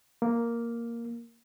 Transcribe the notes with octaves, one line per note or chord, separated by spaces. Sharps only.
A#3